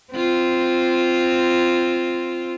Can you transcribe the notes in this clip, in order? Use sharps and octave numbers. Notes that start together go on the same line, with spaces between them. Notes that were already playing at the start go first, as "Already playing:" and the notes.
C4 F4